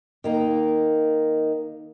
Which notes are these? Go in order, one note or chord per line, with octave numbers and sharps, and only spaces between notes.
D#3 A#3 D#4